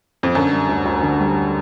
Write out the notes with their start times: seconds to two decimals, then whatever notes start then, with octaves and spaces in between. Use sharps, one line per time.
0.23 F2
0.35 F#2 D3
0.52 G3
0.69 D2
0.85 D2
1.03 D3
1.20 G3